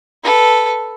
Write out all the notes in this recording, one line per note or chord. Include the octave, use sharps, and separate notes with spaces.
A4 B4